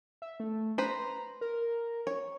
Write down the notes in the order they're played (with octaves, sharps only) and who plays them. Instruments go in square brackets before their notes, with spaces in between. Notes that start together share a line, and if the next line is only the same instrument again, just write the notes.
[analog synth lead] E5
A3
[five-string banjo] B4 C5 [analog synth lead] A#5
[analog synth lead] A#4
[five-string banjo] C#5